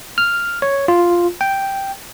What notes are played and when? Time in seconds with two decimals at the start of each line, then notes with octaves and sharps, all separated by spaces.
0.18 F6
0.62 C#5
0.88 F4
1.41 G5